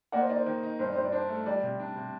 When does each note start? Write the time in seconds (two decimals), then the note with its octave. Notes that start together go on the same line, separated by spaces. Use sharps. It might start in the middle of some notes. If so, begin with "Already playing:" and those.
0.12 A#3 D5 F#5
0.21 C5 D#5
0.29 D#4 D5
0.38 C5
0.46 D#3
0.63 D#4
0.79 G2 C5
0.88 D5
0.96 G2 C5
1.04 D5
1.12 D4 C5
1.29 A3
1.46 G3 D5
1.63 C3
1.80 D4
1.96 C3